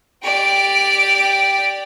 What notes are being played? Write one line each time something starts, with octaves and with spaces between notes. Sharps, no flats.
G4 D5